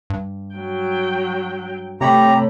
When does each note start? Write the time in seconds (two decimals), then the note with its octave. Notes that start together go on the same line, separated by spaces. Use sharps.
0.10 G2
0.56 F#3 G5
2.01 C3 A3 G4 C#5 A#5 B5